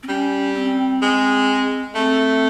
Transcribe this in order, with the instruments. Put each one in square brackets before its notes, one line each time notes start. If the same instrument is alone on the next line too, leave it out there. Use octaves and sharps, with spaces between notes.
[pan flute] C4
[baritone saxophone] G3 [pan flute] C#4
[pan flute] C4
[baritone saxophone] G#3
[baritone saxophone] A3 [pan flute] C4